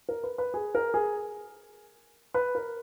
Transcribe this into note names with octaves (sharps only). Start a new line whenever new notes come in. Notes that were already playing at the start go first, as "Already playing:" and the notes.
A#4
B4
B4
G#4
A#4
G#4
B4
A#4